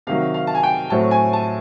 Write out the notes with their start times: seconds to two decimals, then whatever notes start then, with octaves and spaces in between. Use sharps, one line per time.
0.07 C3 D#3 F#3 F5
0.34 F5
0.47 A5
0.55 G#5
0.63 G5
0.90 A2 F#3 A3 C4 A5
1.11 G#5
1.33 A5